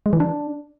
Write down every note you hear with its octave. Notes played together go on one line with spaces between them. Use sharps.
G#3
E3
D4